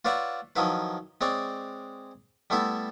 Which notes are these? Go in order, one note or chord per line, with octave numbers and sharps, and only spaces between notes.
F4 B4 C#5 D5 E5 F#5
D#3 F3 F#3 E4 B4
G#3 C4 C#5 D5
G3 A3 B3 E4 E5